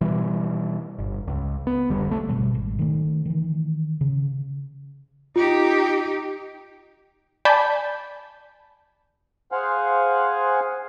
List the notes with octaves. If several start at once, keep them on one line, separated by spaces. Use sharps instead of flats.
B2 E3 G3
G1
C#2
B3
F1 D3 G3
C2 A3
G1 C#2 B2 G3
G#1
D#3 A3
D#3 E3
C#3
D#4 F4 G4
D5 G#5 A5 B5 G6 B6
G#4 C5 F5 F#5 G#5